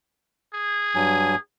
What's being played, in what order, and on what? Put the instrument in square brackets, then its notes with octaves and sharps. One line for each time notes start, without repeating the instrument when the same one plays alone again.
[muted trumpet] G#4
[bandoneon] G2 F#3 G#5